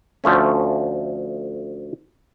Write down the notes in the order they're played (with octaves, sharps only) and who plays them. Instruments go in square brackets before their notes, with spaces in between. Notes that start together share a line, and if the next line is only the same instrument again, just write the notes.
[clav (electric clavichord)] D2 F3 A3 C#4